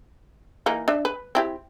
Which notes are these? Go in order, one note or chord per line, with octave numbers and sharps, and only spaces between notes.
E3 A#3 D#4
D4 E5
B4
C4 E4 G4